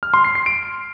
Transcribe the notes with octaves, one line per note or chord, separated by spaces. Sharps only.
F6
C6
C7
C7
D7